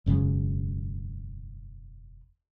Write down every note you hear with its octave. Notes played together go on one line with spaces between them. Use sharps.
E1 F#2 C#3 F3